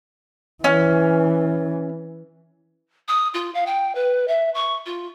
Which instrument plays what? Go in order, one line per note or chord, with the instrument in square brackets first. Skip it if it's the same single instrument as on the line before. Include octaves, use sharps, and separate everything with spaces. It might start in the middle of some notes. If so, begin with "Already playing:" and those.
[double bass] E3 [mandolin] C#4
[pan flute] D#6
F4
F5
G5
B4
E5
C#6
F4